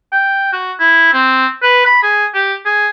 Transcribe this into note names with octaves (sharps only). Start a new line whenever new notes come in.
G5
F#4
E4
C4
B4
B5
G#4
G4
G#4